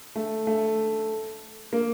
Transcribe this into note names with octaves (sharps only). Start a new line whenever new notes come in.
A3
A3
A#3